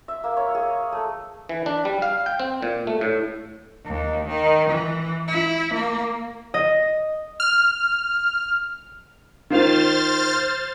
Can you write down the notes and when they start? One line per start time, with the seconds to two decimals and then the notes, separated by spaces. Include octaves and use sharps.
0.08 E5
0.24 A#3
0.37 C#5
0.55 G#4
0.92 A3
1.49 E3
1.66 D4
1.85 G3
2.02 F5
2.26 G5
2.39 C4
2.62 A#2
2.87 A3
3.01 A2
3.85 D#2
4.28 D#3
4.70 E3
5.28 E4
5.74 A#3
6.54 D#5
7.40 F6
9.50 D#3 F4 C5 F6 A6